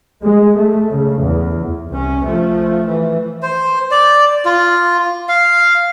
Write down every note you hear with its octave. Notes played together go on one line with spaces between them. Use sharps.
G#3
A3
C#3
E2
C2 C#4
F3 A3
E3
C5
D5
F4
F5